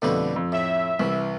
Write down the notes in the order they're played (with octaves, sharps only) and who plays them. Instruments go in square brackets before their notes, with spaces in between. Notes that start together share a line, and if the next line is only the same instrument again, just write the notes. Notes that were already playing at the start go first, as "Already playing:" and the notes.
[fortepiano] F2 B2 A3 [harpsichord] D3 G3 B4
[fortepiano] F2
[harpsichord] A2 [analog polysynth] E5
[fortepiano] C2 [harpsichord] E3